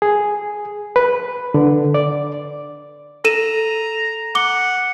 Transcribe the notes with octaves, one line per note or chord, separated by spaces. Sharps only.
G#4
B4
D3
D5
A4 A#5 D#7 E7
F#5 D6 G7